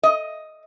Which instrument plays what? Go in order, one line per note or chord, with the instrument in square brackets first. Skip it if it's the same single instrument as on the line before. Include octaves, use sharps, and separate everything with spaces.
[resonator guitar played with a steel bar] D#5